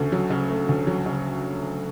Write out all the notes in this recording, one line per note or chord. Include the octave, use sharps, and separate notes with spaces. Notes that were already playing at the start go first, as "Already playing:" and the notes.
Already playing: D2 C#3 A3
F#3
C#3
A3
D2
F#3
C#3